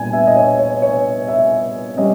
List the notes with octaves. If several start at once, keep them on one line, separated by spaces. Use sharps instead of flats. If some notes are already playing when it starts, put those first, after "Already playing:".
Already playing: A#2 G3 B3 G#5
E5
D#5
C#5
C#5
C#5
E5
G3 C#4 D#5